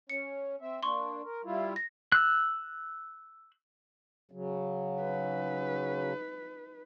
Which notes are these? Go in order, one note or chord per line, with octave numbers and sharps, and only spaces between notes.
C#4 C#7
C4 E5
A#3 D4 C6 C#6
A#4
G3 E4 F4
A#6
E6 F#6
C#3 F#3
D#4 B4